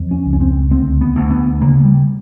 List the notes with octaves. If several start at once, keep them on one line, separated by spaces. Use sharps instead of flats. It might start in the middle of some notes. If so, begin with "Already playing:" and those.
Already playing: F2
C#4
C#2
C#4
C4
D2 C4
B3
D2
B3
C#3 A#3
G3